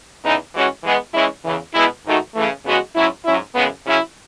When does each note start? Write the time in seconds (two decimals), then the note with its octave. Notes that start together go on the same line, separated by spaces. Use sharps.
0.23 E2 C#3 E3 B3 D#4
0.54 E3 G#3 C#4 F#4
0.84 E3 G#3 B3
1.13 E3 G#3 C#4 E4
1.44 E2 C#3 E3
1.74 B2 G#3 B3 E4
2.04 G#2 D#3 A3 D#4 F#4
2.35 C#3 E3 A3
2.65 E2 C#3 G#3 B3 F#4
2.95 G#2 F#3 C#4 E4
3.25 G#2 F#3 C#4 E4
3.55 F#2 C#3 E3 G#3 B3
3.85 C#3 F#3 C#4 E4